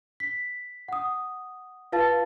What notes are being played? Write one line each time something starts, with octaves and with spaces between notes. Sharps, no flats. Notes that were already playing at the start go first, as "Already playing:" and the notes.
B6
F#5 D#6
F4 B4 F5 A5 A6